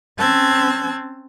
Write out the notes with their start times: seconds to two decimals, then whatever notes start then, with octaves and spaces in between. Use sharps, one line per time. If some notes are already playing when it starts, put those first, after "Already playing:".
0.18 C4 C#4 A5 E6 F#6 G#6